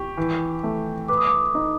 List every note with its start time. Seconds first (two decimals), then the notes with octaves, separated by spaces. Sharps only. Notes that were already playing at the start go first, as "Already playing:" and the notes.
Already playing: G4 C#6
0.17 E3
0.64 A3
1.08 B4 D6
1.18 D#6
1.27 D6
1.55 D#4